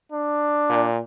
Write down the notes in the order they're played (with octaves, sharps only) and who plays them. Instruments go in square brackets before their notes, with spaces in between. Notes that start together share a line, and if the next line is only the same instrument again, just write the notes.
[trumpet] D4
[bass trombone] A#2